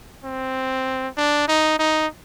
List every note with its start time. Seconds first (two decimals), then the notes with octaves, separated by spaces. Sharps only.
0.24 C4
1.17 D4
1.48 D#4
1.79 D#4